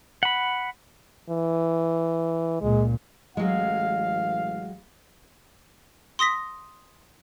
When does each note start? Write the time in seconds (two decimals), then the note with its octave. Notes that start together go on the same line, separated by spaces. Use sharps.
0.23 F#5 B5
1.30 E3
2.61 C#2 A#2 G#3
3.37 A1 F#3 G#3 F5
6.19 C6 D#6 A#6 B6